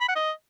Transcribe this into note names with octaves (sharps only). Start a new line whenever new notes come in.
B5
F#5
D#5